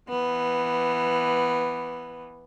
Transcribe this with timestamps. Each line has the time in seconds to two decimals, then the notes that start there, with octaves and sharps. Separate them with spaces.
0.10 E3 B3